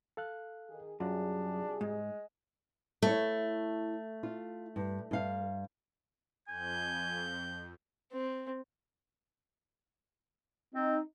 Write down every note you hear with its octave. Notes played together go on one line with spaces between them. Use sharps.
A4 F5 F#6
D#3 G#4
F#2 C3 G3 D4 F4 F#4 G#4 F#5
G#2 G#3
A3 E4 C#5
F4
G2
G2 F5
F2 G#5 G6
C4
C4 D#4